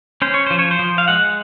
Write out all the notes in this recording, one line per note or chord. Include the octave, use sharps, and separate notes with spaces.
C#4 C5
C#5
F3 C5
C#5
C5
F3
F5
G#3 F#5